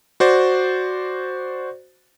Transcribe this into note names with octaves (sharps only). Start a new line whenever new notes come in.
F#4 C5 D5